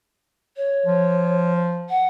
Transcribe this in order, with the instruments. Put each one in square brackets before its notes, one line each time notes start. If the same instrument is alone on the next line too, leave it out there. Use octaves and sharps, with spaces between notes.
[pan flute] C#5
[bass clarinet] F3
[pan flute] F#5